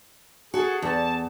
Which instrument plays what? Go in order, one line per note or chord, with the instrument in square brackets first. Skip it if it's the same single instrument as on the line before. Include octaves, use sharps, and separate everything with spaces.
[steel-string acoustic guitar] F#4 A4 [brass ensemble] G#4
[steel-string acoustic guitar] E2 [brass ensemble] A5